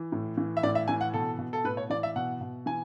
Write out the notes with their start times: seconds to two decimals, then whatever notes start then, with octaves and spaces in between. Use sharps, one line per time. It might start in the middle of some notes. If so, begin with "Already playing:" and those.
Already playing: E3
0.12 A2
0.37 E3
0.57 E5
0.63 A2 D5
0.75 E5
0.88 E3 G#5
1.01 F#5
1.14 B2 A4
1.39 B2
1.53 A4
1.64 A2 B4
1.77 C#5
1.90 E3 D5
2.03 E5
2.16 B2 F#5
2.41 B2
2.66 E3 G#5